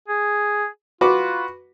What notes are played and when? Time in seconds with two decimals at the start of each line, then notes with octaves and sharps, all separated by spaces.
0.08 G#4
1.01 F4 F#4 B4 D6